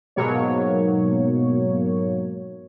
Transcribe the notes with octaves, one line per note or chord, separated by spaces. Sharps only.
G#2 B2 F#3 A#3 C#5